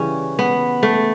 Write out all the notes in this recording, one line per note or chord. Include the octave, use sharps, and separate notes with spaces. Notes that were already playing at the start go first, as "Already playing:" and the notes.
Already playing: C#3 E3 G3 C#4
B3
A3